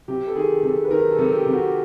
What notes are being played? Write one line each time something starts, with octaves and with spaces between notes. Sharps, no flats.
C3 G4
A4
D#3 G#4
C3 A4
B4
D#3 A#4
A4
C3
G4
C3
F#4